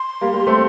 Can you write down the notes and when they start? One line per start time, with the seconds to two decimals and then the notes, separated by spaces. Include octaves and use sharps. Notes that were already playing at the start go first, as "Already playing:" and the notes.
Already playing: C6
0.21 G3 A#3
0.34 G3 A#3
0.47 A3 C4